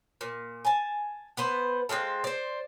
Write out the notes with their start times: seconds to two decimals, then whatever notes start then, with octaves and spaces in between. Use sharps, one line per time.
0.21 A#2
0.65 G#5 A5
1.37 B3 B4 C5
1.89 G#3 C4 F4 A4
2.24 C5 D5